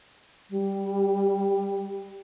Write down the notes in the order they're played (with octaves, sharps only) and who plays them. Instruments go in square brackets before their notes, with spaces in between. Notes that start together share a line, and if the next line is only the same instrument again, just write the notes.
[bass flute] G3